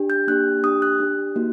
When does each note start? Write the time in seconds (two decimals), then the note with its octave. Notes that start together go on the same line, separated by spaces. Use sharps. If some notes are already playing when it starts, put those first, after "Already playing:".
Already playing: D4 G4
0.10 G6
0.27 A#3 D4 G4 F#6
0.63 D4 G4 D#6
0.82 F#6
1.00 D4 G4
1.36 A#3 D#4 F#4